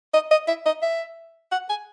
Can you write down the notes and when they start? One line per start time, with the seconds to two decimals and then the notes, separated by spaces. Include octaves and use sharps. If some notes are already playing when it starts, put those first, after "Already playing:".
0.14 D#5
0.31 D#5
0.48 E5
0.66 D#5
0.82 E5
1.52 F#5
1.69 G#5